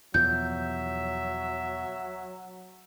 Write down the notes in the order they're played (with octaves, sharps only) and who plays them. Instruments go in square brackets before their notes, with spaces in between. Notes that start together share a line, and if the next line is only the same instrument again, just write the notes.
[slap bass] E2 B2 F3 [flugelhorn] F#3 [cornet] E5 [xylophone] G6